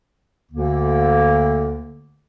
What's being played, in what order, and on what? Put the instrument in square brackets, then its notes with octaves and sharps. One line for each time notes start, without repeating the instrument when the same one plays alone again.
[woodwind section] D2 D3 A#3